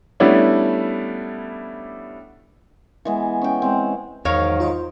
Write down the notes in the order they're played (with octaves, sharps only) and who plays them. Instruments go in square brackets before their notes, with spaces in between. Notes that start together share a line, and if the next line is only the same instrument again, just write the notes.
[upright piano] G3 A3 B3 C#4 D4 E4
[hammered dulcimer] E3 G#3 B3
C#4 G5
G#3 C4
[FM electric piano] E2 [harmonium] G#2 F#3 [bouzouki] D#3 F5 [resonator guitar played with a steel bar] C#5
[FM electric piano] F4 C5 D#5